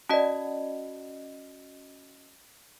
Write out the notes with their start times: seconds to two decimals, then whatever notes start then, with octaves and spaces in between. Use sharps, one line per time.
0.09 C#4 F#4 D5 D#5 A5